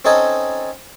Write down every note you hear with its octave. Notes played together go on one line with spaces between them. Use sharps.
C4 C#4 D#4 A4 D#5 G#5